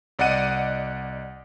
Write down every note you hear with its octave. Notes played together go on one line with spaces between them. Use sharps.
C2 D5 D#5 F#5 D#7